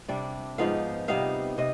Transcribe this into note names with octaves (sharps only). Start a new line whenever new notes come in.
C3 G3 D4 D5
G#2 F3 B3 D#4 F5
C3 G3 B3 D#4 F5
C3 D#5